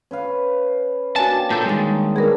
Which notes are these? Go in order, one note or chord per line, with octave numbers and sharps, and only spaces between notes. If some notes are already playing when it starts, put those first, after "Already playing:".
C#4 B4 F5
A#3 C#4 D4 F#4 G#5 A5
G5
A#2 A4 A5 G6
D#3 G3 G#3 A6
B3 D4 G#4 A#4